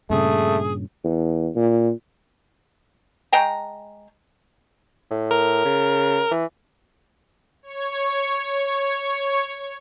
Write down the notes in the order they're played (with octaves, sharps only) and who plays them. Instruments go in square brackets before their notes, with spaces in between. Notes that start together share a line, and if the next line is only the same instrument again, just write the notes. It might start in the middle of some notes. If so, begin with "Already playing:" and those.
[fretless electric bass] G2 A#2 C#3 [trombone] A3 [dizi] G#4
[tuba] E2
A#2
[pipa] G#3 G5 A5 A#5
[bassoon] A2
[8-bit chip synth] A#4
[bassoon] C#3
E3
[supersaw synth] C#5 C#6